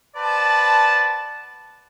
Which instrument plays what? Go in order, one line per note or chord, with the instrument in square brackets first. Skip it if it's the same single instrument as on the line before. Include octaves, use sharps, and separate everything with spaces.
[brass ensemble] B4 C5 D5 F#5 A5